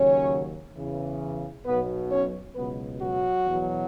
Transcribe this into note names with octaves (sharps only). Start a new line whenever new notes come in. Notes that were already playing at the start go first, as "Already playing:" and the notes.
Already playing: D#2 C#3 F#3 C#4 C#5
E2 C#3 E3
B1 B2 F#3 B3 B4
C#4 C#5
C#2 B2 F#3 B3 B4
F#3 F#4
E2 B2 F#3